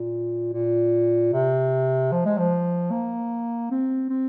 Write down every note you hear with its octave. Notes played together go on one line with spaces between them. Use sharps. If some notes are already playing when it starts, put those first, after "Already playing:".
Already playing: A#2
A#2
C3
F3
G#3
F3
A#3
C4
C4